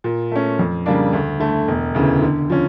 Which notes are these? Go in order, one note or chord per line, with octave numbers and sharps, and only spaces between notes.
A#2
A3 C#4
F2
C#3 G3 A#3 D4
D2
D3 A3
E1
D2 C#3 E3
D3
F3 C#4